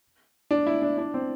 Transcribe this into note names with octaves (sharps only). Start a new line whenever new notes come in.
D4
E4
D4
D4
C4